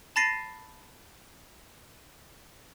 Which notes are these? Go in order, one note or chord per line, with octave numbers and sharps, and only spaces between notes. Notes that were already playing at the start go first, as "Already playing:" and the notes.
A5 B5 A6 A#6 C7 D#7